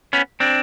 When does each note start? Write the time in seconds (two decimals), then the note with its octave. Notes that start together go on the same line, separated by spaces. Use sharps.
0.13 B3 C#4
0.40 C4 D4